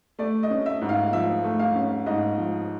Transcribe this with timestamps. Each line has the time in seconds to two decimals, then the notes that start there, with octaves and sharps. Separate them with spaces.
0.19 A3 D5
0.43 D#5
0.50 C#4
0.66 E5
0.82 G#2
0.89 F5
1.13 F3 E5
1.44 A3
1.59 F5
1.75 C#4
2.06 G#2 D#5
2.38 F3